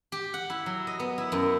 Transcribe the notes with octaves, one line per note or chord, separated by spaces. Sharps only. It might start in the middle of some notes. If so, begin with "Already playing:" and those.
G4
F#5
E4
F#3
D#5
B3
E4
F#2